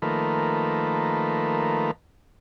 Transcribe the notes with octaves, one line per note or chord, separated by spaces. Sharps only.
D#3 F3 A3 A#3 B4